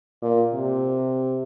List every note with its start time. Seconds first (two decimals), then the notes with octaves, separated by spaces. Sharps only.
0.22 A#2
0.54 C3